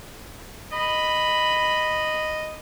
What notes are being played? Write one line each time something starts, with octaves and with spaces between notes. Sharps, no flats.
D#5 B5